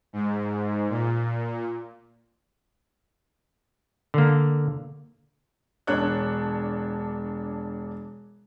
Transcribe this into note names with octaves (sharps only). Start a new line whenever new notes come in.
G#2
A#2
D3 A#3
E1 D4 C#5 F#6